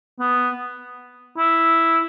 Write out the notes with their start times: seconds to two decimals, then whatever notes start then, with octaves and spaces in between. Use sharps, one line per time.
0.19 B3
1.38 E4